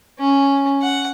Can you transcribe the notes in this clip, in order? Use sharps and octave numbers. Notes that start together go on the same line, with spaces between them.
C#4
F#5